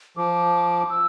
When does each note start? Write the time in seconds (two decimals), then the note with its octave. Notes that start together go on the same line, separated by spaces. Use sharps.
0.17 F3 D6
0.90 E6